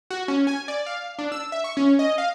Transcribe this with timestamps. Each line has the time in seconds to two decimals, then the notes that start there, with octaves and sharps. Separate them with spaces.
0.11 F#4
0.28 C#4
0.47 G#5
0.68 D5
0.86 F5
1.19 D4
1.32 E6
1.52 E5
1.64 C#6
1.77 C#4
1.99 D#5
2.18 F5